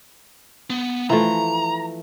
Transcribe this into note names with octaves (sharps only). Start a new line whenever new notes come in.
B3
E3 F3 A3 A#5